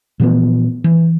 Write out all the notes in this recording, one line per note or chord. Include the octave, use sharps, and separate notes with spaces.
A#2 E3 F3 B3
E3